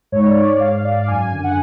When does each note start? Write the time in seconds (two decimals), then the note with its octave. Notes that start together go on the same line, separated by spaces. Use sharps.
0.12 G#2 C#5
0.29 D5
0.44 D5
0.60 G#2 F5
0.72 F5
0.84 D5
0.96 F5
1.08 F#2 G#5
1.20 G#5
1.32 D3 G#5
1.44 F#5